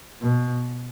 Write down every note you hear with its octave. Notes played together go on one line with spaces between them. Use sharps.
B2